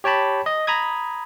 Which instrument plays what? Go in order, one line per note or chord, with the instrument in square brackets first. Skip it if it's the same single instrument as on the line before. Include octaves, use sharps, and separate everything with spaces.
[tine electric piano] G4 C#5 G5 A5 B5
D#5
A#5 B5 D#6 G#6